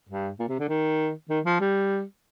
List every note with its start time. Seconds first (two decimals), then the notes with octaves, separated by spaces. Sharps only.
0.09 G2
0.39 A#2
0.48 C3
0.59 D3
0.69 D#3
1.29 D#3
1.45 F3
1.61 G3